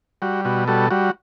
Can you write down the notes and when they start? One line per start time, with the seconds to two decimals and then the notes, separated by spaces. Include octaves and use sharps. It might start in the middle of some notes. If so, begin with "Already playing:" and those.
0.22 G3 F#4
0.45 B2 F#4
0.68 G3 F#4 A4
0.91 G3 F#4